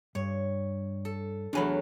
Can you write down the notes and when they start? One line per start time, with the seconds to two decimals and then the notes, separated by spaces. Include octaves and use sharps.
0.15 G2 C#5
1.05 A4
1.53 E2 F#3 A3 D4 G#5 B5